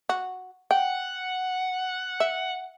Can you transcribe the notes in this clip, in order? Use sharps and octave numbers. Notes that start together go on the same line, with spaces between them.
F#4
F#5 G5
E5